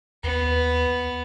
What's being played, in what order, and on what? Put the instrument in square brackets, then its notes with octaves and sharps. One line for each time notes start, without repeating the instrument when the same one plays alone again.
[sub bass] D#2 [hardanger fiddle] B3